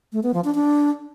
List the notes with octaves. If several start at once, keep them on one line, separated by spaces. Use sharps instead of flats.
A3
B3
F3
D4
D4